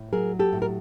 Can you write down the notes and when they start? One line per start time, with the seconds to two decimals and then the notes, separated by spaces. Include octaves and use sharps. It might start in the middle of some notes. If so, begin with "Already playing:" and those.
Already playing: A2
0.13 F#3 G#4 A#4
0.39 G4 A4
0.53 A2
0.62 A#4